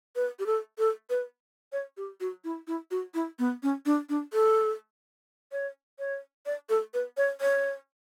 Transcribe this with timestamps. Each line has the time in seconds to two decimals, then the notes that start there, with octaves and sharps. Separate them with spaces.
0.16 B4
0.39 G4
0.46 A4
0.78 A4
1.10 B4
1.72 C#5
1.97 G4
2.21 F#4
2.44 E4
2.67 E4
2.91 F#4
3.14 E4
3.39 B3
3.63 C#4
3.86 D4
4.09 D4
4.33 A4
5.52 C#5
5.99 C#5
6.46 D5
6.69 A4
6.94 B4
7.17 C#5
7.41 C#5